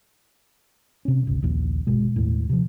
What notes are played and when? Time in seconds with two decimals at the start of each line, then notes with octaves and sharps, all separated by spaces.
1.05 C3 C#4
1.27 G1 C#2
1.42 A#1 D#2
1.87 G1 B2 G#3
2.16 D#2 A2
2.49 C3 F3